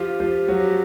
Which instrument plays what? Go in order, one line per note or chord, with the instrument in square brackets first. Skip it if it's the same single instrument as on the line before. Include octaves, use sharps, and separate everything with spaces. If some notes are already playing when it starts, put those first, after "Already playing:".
Already playing: [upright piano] F3 F4 [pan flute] G4
[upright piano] F3 F4
F#3 F#4